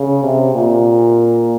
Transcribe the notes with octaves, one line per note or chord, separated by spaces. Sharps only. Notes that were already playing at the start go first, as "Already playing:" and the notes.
Already playing: C#3
C3
A#2